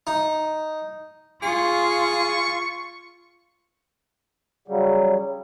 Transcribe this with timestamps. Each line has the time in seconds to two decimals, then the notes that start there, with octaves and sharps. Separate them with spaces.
0.07 D#4
1.42 F4 G#4 C#6
4.68 C#3 F#3 G3